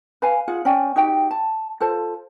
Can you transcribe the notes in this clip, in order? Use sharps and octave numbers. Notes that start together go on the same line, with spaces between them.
B4 F5 G#5
F4 G#4 F#5
C#4 D5 G5 G#5
D#4 F#4 G4 G5
A5
F4 A4 C5 A5